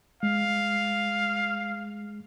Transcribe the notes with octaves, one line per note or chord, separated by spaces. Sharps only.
G#3 F5